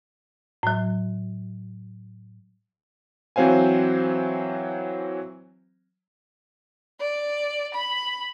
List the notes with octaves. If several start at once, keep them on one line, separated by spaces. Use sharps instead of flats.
A2 F#3
E3 F#3 C4 C5 F5 G#5
D5
B5